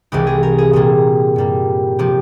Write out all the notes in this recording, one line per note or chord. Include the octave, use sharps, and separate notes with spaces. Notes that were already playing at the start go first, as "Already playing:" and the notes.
C2 C3 E3 G#3 G4
G#4
A#4
G#4
A#2 G3 A#3 G#4
G2 G3 A#3
C3 F3 G4